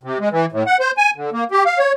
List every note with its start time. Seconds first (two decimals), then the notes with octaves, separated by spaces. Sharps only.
0.03 C3
0.20 G#3
0.31 E3
0.52 A2
0.67 F#5
0.80 C5
0.97 G#5
1.16 D3
1.33 A#3
1.51 G4
1.66 F5
1.79 C#5